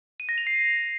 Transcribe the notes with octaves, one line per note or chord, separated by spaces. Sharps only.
D#7
A#6
F7
C7